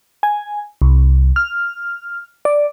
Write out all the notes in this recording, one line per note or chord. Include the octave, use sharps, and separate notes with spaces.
G#5
C2
F6
D5